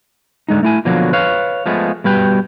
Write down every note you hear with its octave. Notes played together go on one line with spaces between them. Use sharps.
D3 G#3 D#4
A3 E4 G#5
B2 D3 F3 F#3 A#3
B4 C#5 F5
F3 G#3 A3 B3
B2 G3 B4 G5